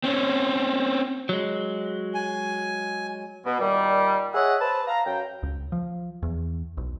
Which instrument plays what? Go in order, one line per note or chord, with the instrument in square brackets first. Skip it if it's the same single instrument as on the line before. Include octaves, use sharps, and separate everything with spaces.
[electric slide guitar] C4 C#4
[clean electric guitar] F#3 G#3
[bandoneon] G#5
[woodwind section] B2
A#2 D#3 G3
G#4 C#5 D#5 E5 F#5
B4 C5 A5
F5 A#5
F#2 G5
[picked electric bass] C#2
F3
E2
B1